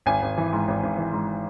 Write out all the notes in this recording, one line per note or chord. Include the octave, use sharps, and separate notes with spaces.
G#1 G#5
G#1
E3
G#2
G#1
G#1
E3
G#2